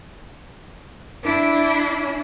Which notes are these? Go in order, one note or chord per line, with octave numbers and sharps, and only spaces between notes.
D4 E4